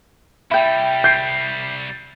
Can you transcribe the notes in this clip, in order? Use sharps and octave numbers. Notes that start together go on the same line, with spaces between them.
C2 G3 E4 G5
G6 C7 D7